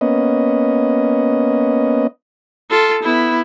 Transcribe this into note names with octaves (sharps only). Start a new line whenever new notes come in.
A#3 B3 C#4 D#5
F4 A4
B3 E4